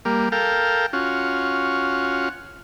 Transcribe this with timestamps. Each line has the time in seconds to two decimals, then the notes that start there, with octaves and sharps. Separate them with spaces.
0.05 G3 A#3
0.32 A4 A#4 F5 G5
0.93 C#4 F4 F#4